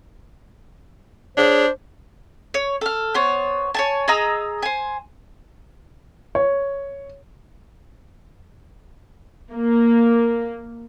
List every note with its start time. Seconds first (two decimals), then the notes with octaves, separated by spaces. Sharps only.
1.37 D4 G#4 C5 C#5
2.54 C#5
2.81 A4 F6
3.14 B3 C5 C#5
3.74 C#5 G#5 A5
4.08 G#4 D#5 A#5 E6
4.62 C5 G#5
6.35 C#5
9.53 A#3